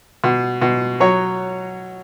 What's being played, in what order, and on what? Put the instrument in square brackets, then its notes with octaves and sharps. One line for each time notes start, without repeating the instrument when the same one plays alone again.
[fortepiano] B2
B2
F#3 C#5